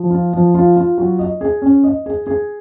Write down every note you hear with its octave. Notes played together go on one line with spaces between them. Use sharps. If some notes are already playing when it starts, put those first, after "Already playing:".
Already playing: F3
F4
F3
F4
F4
F#3
D#5
G#4
C#4
D#5
G#4
G#4